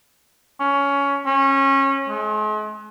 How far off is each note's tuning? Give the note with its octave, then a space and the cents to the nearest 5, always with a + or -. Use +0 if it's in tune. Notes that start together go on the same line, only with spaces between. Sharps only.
C#4 +15
C#4 -25
G#3 +45